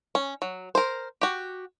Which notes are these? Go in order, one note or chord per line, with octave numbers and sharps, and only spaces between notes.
C#4
F#3
A#4 C5
F#4 G4